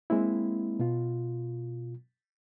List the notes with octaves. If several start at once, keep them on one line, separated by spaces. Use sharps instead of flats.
G#3 A#3 C4 E4
B2 F4